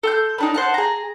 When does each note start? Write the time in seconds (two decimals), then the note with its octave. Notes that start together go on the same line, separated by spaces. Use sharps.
0.03 A4 C6 G6
0.38 B3 D4 D#4
0.54 C5 F#5 A5
0.74 G#4 A#5